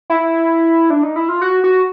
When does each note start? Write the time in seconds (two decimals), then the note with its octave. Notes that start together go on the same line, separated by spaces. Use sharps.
0.10 E4
0.90 D4
1.03 D#4
1.16 E4
1.29 F4
1.41 F#4
1.64 F#4